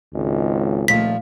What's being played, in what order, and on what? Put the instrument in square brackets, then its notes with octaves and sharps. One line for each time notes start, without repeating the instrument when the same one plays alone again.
[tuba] G#1 [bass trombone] C#2
[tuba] D#1 [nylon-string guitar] A#2 F3 A3 [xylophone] B6